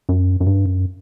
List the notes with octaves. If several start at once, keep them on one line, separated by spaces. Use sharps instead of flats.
F#2
F#2
G2
F#2